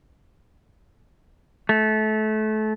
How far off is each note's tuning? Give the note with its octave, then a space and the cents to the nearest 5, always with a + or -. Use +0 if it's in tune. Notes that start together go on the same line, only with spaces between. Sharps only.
A3 -25